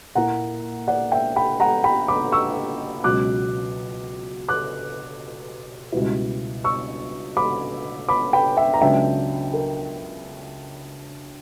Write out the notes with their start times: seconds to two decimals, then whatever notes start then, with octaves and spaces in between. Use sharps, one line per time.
0.15 A#2 A#3 E4 F#5 A#5
0.88 D5 F#5
1.12 E5 G5
1.36 G5 B5
1.60 F#5 A#5
1.84 G5 B5
2.08 B5 D6
2.32 C#6 E6
3.04 C#2 B2 F#3 D6 F#6
4.48 D6 F#6
5.92 C#2 B2 G3 B3 E4
6.64 C#6 E6
7.37 B5 D6
8.09 B5 D6
8.33 G5 B5
8.57 E5 G5
8.74 A#5
8.81 C#2 C#3 F#3 B3 D4 E5 G5
9.53 A#4